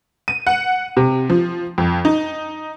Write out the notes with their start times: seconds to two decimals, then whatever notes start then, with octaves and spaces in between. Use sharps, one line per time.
0.28 D#7
0.47 F#5
0.97 C3
1.30 F3
1.78 F2
2.05 D#4